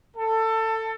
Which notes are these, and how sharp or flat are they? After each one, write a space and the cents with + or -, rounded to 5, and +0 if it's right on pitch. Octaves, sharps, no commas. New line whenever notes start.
A4 +20